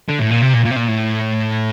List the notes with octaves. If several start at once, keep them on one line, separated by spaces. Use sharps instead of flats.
D3
A2
A#2
C3
A#2
A#2
C3
A#2
A2